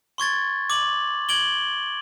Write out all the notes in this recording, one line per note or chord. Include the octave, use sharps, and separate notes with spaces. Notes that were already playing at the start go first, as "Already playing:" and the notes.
C6 C#6 G#6 A6
D6 F#7
G#6 D7 F#7 G7